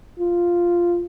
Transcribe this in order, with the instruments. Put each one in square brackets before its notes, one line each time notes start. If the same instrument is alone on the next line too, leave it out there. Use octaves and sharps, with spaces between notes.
[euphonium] F4